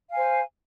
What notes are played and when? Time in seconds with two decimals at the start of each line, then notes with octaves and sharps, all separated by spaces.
0.08 F5
0.11 G#5
0.15 C5